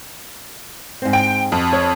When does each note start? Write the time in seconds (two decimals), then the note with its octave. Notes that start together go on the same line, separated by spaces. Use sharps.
1.02 G#2 C4
1.13 G5
1.52 F2 F#4
1.73 C#5